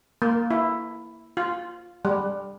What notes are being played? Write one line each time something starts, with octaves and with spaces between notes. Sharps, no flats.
A#3
E4
F4
G3